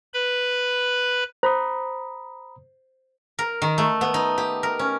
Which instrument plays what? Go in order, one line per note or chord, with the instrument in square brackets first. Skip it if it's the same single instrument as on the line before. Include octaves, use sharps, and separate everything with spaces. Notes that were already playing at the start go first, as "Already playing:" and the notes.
[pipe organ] B4 B5
[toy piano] C5 [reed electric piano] A#5 B5 D#6
[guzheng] A#4
D#3
A3
B3
D#4
G4
A#4
C#4